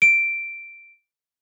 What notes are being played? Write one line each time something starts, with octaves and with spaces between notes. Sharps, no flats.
D7